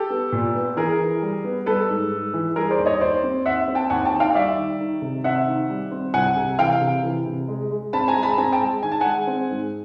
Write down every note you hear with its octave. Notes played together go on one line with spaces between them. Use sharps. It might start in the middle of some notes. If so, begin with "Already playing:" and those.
Already playing: G4 A4
B3
A#2
B3
E3 G#4 A#4
E3
G3
B3
G3 A4 B4
G#2
G#2
E3
G3 G#4 A#4
C5 D5
D#2
C#5 D#5
D#2 C5 D5
C4
D#2 E5 F#5
C4
G5 A5
D#2 F#5 G#5
G5 A5
D#3
F5 G5
G3 D5 E5
D#3
D#3
C3
C4 E5 F#5
D#3
G3
C4
C2 F#5 G#5
C3
E3 F5 G5
C3
E3
C3
G#3
G#3
C4 A5 B5
G#5 A#5
G#3
A5 B5
C4 G#5 A#5
G5 A5
G#3
D#3 G#5
A5
G#3 F#5 G#5
C4
G#2